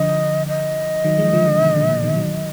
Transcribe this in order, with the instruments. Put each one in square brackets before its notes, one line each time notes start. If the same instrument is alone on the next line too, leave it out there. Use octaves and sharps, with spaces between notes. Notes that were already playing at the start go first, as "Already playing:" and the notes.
Already playing: [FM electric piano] D3 F3 [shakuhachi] D#5
[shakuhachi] D#5
[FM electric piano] D#3 F#3
F3 G#3
D3 F3
D3 F3
B2 D#3
A#2 D3
A#2 D3
B2 D#3
D#3 F#3